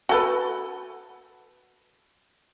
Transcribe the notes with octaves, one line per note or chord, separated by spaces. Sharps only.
F#4 A4 B4